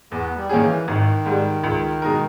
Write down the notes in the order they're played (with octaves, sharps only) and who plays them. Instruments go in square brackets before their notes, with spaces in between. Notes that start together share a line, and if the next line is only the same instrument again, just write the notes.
[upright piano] E2 [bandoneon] B3
[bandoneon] G3
[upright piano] D#3 A#3 C#4 G#4
[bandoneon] E3
[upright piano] G#1 [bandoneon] D#3
[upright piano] G#2 G3
C#2
B2 G#3 D#4 A#4